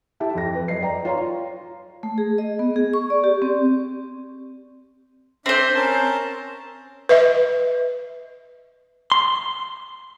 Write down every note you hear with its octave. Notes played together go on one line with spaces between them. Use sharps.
E4 G4 E5 A5
F2 A#6
B4
F#2 D#5 C7
D5 G5 A#5
F4 C#5 A#5 C6
A3
G#4
D#5
B3
G#4
C#6
D5
G4
C4
C4 D4 C5 E5
C#4 A#4 A5
B4 D#5 E5
C6